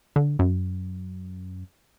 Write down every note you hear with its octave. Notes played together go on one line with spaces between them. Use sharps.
D3
F#2